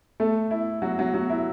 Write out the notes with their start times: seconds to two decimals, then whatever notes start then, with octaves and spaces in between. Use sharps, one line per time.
0.20 A3 A4
0.51 E4
0.82 F#3 F#4
0.99 F#3 F#4
1.14 F#3 F#4
1.30 E4